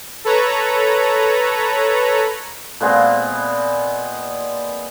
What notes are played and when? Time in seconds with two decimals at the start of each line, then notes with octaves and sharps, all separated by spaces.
0.25 A4 B4 C#5 A#5
2.80 A#2 G#3 B3 C4